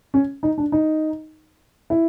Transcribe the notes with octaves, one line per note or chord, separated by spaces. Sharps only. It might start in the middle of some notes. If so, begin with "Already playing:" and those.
C#4
D#4
D4
D#4
E4